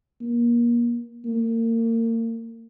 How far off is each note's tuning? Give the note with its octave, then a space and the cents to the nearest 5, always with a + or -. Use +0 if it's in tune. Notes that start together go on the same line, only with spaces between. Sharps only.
A#3 +30
A#3 -35